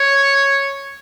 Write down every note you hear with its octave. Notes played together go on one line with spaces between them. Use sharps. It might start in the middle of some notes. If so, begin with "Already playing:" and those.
Already playing: C#5